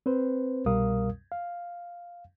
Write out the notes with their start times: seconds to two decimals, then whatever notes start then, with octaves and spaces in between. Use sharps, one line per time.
0.06 C4 B4 C5
0.66 C2 B2 G3 A#4 F5 D#6
1.32 F5